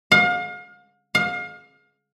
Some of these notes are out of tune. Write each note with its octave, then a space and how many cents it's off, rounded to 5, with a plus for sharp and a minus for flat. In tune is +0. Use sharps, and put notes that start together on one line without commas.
F5 +35
F5 +30